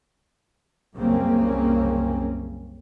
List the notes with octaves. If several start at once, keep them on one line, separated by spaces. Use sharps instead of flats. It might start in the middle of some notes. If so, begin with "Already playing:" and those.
C2 F#2 C#3 A#3 C4 C#4